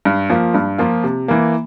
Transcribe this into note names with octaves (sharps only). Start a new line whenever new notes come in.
G2
F3 A#3 F4
G2
F3 A#3 F4
C3
E3 A#3